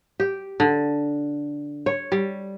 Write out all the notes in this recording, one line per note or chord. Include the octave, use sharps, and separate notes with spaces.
G4
D3
C#5
G3